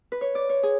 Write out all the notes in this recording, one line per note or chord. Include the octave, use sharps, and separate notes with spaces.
B4
C#5
D5
C#5
G#4